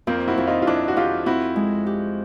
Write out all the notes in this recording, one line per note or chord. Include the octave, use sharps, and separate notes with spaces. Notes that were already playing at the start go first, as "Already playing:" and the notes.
F2 A#3 C4
E4 F#4
F2
D#4 F4
F4
F2 D4 E4
F#4
F2 F4 G4
C4 E4 F#4
G#3
G4